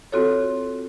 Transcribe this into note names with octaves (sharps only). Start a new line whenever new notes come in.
C4 F4 F#4 A4 C#5